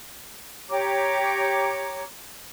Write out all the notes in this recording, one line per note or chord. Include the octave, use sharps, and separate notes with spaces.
G4 C#5 A#5 D6